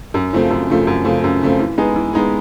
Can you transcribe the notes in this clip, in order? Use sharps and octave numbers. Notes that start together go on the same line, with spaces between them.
F#2
C#3 F3 A3 C4
F#2
C#3 F3 A3 C4
F#2
C#3 F3 A3 C4
F#2
C#3 F3 A3 C4
E3
G#3 B3 D#4 G#4
E3
G#3 B3 D#4 G#4